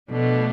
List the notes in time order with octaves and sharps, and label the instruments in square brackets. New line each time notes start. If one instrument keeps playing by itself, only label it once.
[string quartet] B2 [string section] F3 A3 D4